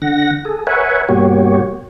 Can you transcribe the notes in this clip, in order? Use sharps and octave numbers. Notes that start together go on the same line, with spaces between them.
D3 F#5 A#6
G#4 A4
A#4 B4 C#5 E5 F#5 G#5
G2 B2 A#3 F#4 G4 C#5